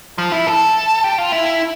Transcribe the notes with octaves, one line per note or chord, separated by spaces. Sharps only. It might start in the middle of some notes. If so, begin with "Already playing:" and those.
F3
E4
A4
G4
F4
E4